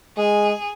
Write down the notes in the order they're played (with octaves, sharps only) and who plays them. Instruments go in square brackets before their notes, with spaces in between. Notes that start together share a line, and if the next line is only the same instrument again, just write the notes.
[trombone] G#3 [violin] G#4